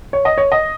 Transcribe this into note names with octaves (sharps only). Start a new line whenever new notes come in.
C#5
D#5
C#5
D#5